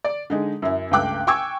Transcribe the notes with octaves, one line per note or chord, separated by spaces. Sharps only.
D5
D3 G#3 D#4
F#2 C#4 E4
C#2 G2 A3 G5 D6 F#6
G5 G#5 C#6 D6 E6 G#6